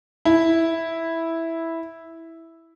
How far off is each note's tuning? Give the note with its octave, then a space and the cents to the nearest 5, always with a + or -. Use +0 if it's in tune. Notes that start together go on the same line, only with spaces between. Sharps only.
E4 -5